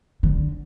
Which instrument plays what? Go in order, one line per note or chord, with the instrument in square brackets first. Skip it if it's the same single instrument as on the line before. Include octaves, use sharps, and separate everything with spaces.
[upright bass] D3